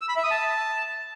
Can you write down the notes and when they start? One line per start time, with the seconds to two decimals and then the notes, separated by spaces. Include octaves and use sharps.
0.01 E6
0.09 B5
0.16 E5
0.24 D#6
0.31 A5